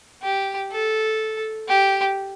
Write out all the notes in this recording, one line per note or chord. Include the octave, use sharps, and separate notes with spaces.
G4
A4
G4